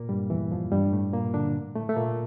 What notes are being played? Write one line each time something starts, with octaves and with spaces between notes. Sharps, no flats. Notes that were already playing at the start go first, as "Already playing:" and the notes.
Already playing: A#2 A#3
G2 G3
E2 E3
F2 F3
G2 G3
A2 A3
A#2 A#3
D3 D4
A2 A3
A3
A#2 A#3